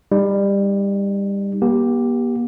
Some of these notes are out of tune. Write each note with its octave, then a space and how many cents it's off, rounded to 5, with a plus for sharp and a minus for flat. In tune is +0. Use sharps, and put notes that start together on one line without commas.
G3 +20 D#4 +0
A#3 +45 G4 +0